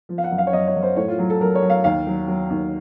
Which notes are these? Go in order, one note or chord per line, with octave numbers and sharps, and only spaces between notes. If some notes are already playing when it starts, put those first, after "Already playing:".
F3
F5
F#5
F#2
F5
C#5
F#2 D#5
C#5
F#2
C5
A2 C#5
F4
F#3
A4
F#3 A#4
C#5
F#3
F5
D#2 F5
F#3
F#3
D#2